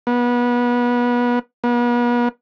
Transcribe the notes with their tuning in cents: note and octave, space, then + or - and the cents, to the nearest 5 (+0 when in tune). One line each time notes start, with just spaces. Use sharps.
B3 -25
B3 -40